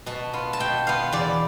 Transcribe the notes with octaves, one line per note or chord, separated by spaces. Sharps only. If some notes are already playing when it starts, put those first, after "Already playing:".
B2 A5
B3 F4
A5
B2 G5
B3 F4 F5
E2 D5